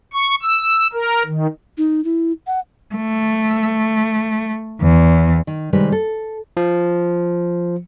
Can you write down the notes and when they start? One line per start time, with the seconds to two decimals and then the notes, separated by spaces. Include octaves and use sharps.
0.13 C#6
0.42 E6
0.93 A#4
1.26 D#3
1.78 D#4
2.05 E4
2.47 F#5
2.95 A3
4.81 E2
5.47 D#3
5.73 C3 D#3 G3 G#3 B4
5.92 A4
6.57 F3